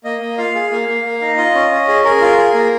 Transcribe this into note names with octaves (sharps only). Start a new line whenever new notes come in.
A#3 D#5
A#3
F4 F5
G#4
A#3 F5
A#3
A#3
D#4
F4 D#5
C#4
C#4
G#4
G#4 A#4
F4
G#4
A#3